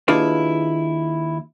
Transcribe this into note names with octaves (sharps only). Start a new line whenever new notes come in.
D#2 D4 E4 F4 G#4 B4